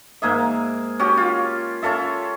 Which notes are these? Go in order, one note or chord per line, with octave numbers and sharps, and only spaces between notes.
G#2 A#3 G#4 E5
C#4 F#4 G4
F4
C#4 F4 A4 E5